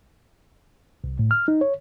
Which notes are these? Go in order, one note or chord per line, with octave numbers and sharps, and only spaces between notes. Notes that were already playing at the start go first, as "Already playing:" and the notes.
C2
A2
F6
D#4
C#5